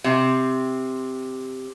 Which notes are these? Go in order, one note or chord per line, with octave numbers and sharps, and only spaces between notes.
C3 C4